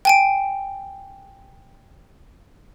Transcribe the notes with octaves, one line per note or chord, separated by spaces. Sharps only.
G5 G#5 D7